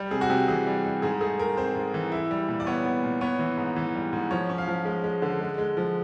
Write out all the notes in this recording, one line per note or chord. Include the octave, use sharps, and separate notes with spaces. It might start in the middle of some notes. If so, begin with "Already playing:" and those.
Already playing: G3
C3 G#4
F#4
C3 G4
E3 G#4
G3
G3
G#2 G#4
A3 G#4
A3 A#4
C4 C5
G#2
E3
E4
G3
A#2
D5
B3 C#5
B3
A#2
B3 C#5
E3
G#2
E3
G3
G#2
F3 C#5
C#4
F5
F3
G#3
G#3
D3
G#3
G#3
F3